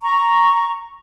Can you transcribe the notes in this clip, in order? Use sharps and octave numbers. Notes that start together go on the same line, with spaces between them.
A#5 C#6